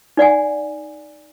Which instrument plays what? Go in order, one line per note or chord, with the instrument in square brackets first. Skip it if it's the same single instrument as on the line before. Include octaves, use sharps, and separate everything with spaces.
[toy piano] D#4 D5 F#5 G#5